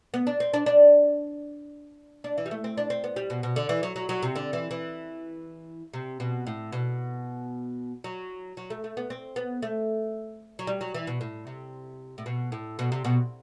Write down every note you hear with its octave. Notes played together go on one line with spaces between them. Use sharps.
B3
D4
C4
D4
D4
D4
E3
G3
A3
C4
D4
C4
B3
G3
B2
B2
D3
E3
F#3
F#3
F#3
C3
D3
E3
E3
C3
B2
A2
B2
F#3
F#3
A3
A3
B3
C4
B3
A3
F#3
G3
F#3
E3
B2
A2
C3
A2
B2
A2
B2
C3
B2